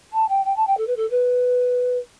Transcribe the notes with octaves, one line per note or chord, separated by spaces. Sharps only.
A5
G5
G5
A5
G5
A4
B4
A4
B4